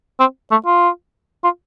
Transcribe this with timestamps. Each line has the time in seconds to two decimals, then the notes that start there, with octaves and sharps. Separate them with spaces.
0.20 C4
0.51 A3
0.66 F4
1.44 F4